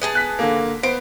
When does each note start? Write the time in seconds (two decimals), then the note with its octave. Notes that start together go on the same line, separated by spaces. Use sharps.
0.02 B3 G#4 A5
0.15 F#6 B6
0.39 D3 A#3
0.83 B3 C5 D7